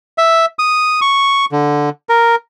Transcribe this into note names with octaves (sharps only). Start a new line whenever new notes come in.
E5
D#6
C#6
D3
A#4